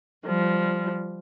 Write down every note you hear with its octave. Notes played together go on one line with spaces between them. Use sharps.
F3 G3